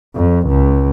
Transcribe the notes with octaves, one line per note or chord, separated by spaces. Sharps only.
F2
C#2